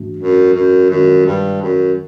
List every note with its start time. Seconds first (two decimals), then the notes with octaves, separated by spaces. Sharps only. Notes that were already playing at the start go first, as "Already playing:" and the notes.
Already playing: G#2 E3 A3 D4 F#4
0.17 F#2
0.54 F#2
0.90 F#2 D#3 G#3 C4 F4
1.25 G2
1.62 F#2